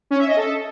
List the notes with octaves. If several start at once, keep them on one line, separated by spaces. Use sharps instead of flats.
C#4
E5
D#5
A4